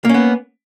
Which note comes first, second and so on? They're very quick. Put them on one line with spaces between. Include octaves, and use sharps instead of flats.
A#3 C#4 B3